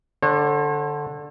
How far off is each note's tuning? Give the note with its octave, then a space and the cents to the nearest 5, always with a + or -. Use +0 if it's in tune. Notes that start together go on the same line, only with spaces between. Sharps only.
D3 +0 C#5 -45